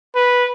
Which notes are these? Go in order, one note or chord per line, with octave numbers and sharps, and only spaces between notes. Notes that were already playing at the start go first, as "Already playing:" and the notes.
B4